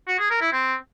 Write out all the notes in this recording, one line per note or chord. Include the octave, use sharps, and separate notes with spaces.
F#4
G#4
A#4
E4
C4